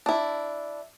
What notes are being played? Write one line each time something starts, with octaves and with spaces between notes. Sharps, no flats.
D4 E4